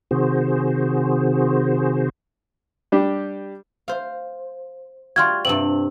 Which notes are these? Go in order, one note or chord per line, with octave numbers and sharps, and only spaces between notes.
C3 D#3 F#4 G#4 C5
G3 D4 G4
C5 F5
G3 F4 F#4 C6 F6 G#6
G2 C3 C4 F#7